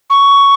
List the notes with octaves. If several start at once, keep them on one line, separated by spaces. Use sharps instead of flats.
C#6